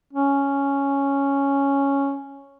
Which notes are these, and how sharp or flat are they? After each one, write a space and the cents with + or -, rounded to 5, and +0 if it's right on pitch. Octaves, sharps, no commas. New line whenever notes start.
C#4 +0